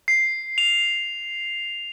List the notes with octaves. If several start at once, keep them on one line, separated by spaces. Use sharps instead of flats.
C7
F7